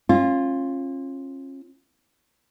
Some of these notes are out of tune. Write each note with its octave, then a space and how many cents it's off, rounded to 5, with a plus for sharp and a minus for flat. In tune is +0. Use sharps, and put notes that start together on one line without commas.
C#4 -35 F4 +0